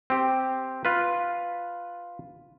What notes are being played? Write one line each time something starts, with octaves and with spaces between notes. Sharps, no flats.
C4 G4
F4 B4